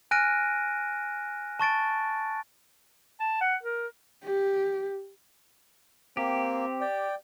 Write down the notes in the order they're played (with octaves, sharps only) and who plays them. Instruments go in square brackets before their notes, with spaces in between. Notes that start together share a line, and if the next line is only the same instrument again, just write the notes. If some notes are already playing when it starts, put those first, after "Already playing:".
[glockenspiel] G#5 F6 F#6 A#6 D7 D#7
A5 C#6 A6 D7
[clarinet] A5
F#5
A#4
[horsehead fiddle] G4
[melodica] A#3 [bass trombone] C4 [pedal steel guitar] G4
[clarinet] D5 [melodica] G5